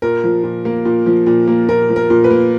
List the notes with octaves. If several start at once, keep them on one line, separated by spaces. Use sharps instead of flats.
A#2 A#4
F3
A#2
A#3
A#2
F3
A#2
A#3
A#2 A#4
F3
A#4
A#2
B4
A#3